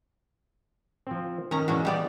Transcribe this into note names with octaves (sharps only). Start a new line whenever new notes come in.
F3 C4
D#3 C#4 A#5
A#2 E3 G#3 C#4 F#4
G3 B3 D5